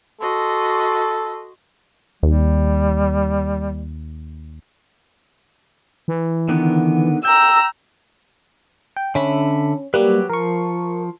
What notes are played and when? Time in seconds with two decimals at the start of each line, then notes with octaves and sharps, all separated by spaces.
0.21 F#4 A4 D#5 C6
2.23 D#2 G3
6.08 E3
6.48 D3 D#3 B3
7.25 G5 A#5 E6
8.97 G5
9.15 D3 C#4 E5 B5
9.94 F#3 G3 A#3 G4 B4
10.30 F3 A#4 C#6